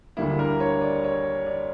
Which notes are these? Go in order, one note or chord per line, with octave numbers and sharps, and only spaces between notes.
D2 D3 G3 A#3 E4
A#4
C#5
D5
C#5
D5